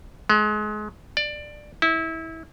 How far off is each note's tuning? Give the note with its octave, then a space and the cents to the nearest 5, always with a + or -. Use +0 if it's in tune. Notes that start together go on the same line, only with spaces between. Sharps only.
G#3 +30
D5 +15
E4 -25